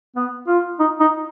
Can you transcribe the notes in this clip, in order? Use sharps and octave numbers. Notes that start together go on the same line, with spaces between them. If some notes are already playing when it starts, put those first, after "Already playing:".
B3
F4
D#4
D#4